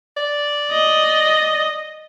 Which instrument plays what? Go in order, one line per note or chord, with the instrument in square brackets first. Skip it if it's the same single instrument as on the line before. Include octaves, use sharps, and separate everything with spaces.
[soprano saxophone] D5
[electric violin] D#5